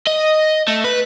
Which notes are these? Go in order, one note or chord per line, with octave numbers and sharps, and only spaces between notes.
D#5
A3
B4